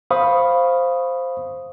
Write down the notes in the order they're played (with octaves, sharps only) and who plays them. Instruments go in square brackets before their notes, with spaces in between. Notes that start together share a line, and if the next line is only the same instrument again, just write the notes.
[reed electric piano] C5 F5 B5 C#6 D#6